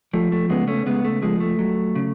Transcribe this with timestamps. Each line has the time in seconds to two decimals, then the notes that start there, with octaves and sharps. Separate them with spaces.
0.13 F3 A3
0.32 A3
0.50 C#3 G#3 B3
0.68 A3 C#4
0.86 C#3 G#3 B3
1.04 A3
1.22 F3 G#3
1.40 A3
1.59 F#3
1.95 C#3